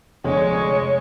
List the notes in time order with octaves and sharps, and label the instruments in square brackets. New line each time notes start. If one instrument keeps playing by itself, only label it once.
[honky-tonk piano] F1 D2 [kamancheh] G#3 C#6 [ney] C#5